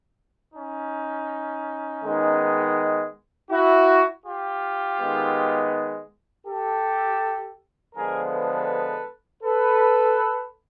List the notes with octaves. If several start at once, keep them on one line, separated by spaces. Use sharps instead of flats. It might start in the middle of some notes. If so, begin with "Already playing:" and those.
C#4 D#4
D#3 G#3 B3
E4 F#4
F4 G4
D#3 G#3 B3
G4 A4
D3 F3 G#3 B3 G#4 A#4
A4 B4
A4 B4